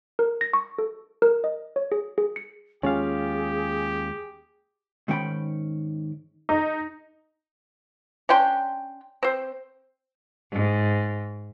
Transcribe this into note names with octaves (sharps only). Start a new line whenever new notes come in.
A#4
A#6
C#6
A4
A#4
D#5
C#5
G#4
G#4
C#7
D#2 G#3 C#4 F4 G4 G#4 F5
G#2 D#3 C#4 G5 B5
D#4
C#4 D4 G5 C6
C4 C5
G#2